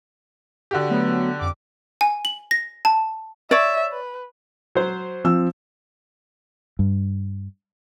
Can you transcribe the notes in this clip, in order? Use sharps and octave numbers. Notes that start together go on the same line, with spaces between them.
D3 F#4 G4
F#3 A3 B3
F2 D6
G#5
F#7
A#6
A5
C#5 D5 E5
B4
F#3 C5
F3 C4 E6
G2